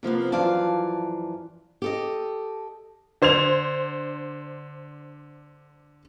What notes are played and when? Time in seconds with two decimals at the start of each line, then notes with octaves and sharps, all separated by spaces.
0.03 C3 F3 A#3 B3
0.32 F#2 E3 F3 D5 F5 A5
1.82 G4 A4 D#5
3.22 D3 C5 G#6 F7